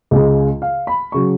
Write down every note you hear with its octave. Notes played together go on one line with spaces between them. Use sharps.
C#2 C#3 G#3 D#5
F5
B5
C#3 F#3 C#6